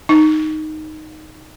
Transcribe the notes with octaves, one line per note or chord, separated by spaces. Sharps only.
D#4